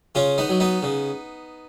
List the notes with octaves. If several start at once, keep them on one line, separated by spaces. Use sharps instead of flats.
C#3 C#4 F4
B3 D#4
F#3
B3 D#4
C#3